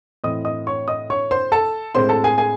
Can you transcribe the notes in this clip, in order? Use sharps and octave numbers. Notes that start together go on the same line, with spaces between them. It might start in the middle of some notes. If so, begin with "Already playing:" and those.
A2 E3 C4 D#5 D#6
D#5 D#6
C#5 C#6
D#5 D#6
C#5 C#6
C5 C6
A4 A5
A2 G#3 C4 C5 C6
A4 A5
G#4 G#5
G#4 G#5